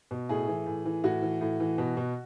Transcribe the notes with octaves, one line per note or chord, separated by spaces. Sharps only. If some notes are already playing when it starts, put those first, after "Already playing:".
B2
A2 G#4
E3
A2
E3
A2 F#4
E3
A2
E3
B2
B2